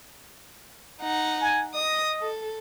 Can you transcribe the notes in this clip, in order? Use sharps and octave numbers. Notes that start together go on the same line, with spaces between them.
D#4 F#5
G#5
D#5 D#6
A4